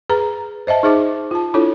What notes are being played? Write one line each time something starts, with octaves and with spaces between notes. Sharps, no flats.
G#4 B4 A#5
C5 D#5 E5 A5
D#4 G#4 C5 E5 D6
F4 A5
D4 E4 F4 A4 C#5